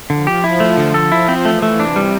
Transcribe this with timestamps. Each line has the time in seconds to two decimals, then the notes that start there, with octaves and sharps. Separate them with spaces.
0.10 D3 F3
0.27 G4
0.44 E4
0.60 A3
0.78 D3
0.94 A4
1.11 F3 E4
1.28 C4
1.45 E3 A3
1.62 A3
1.79 C3 D4
1.96 G3